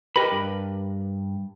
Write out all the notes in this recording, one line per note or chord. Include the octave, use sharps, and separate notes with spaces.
G4 A#4 B4 D#5 B5
G2